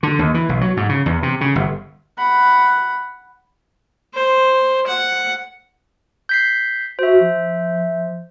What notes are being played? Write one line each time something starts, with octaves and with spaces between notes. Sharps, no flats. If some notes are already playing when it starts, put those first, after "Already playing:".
D3
D#2
E3
B1
F#3
G#2
C#3
E2
C3
C#3
G1
F#5 B5
C5
F#5
G6 B6 C7
F#4 C5 E5
F3